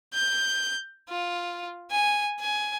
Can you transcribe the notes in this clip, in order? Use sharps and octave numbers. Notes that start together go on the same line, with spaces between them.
G6
F4
G#5
G#5